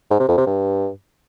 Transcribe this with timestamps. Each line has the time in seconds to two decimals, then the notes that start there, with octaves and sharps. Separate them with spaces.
0.11 G#2
0.20 C3
0.29 F2
0.37 C3
0.46 G2